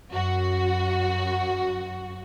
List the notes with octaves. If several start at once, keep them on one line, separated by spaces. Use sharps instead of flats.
F#2 F#4